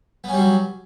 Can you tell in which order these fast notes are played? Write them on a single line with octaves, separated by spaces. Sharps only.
B3 C#4 G3 F#3